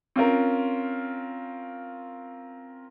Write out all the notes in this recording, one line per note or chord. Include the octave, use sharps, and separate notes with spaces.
C4 C#4 F4 A#4